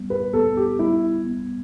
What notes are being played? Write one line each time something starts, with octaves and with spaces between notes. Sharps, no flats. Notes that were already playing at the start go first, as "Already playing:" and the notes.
Already playing: G3 B3
B4
B3 A4
G4
G3 E4
B3